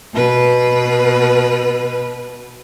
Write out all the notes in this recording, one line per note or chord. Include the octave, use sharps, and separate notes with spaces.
B2 B4